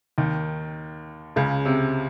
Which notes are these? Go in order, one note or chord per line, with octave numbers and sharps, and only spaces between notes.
D#2 D#3
C#2 C#3
C3